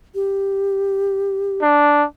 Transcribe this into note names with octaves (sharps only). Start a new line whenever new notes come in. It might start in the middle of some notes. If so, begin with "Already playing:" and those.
G4
D4